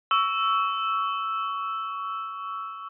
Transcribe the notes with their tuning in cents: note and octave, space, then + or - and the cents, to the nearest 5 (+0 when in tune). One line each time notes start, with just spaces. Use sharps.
C#6 +20 E6 +5